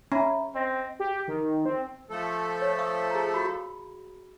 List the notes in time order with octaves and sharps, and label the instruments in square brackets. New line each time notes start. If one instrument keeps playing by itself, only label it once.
[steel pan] C#4 [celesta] E5 A#5 B5
[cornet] C4 [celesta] D#5 A#6
[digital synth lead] G4
D#3
C4
[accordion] F3 A3 A4
[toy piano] C#5
F5 C#6 D#6
G#4 A#5
F#4 B5